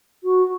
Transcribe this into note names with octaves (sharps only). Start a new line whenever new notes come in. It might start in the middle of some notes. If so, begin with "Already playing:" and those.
F#4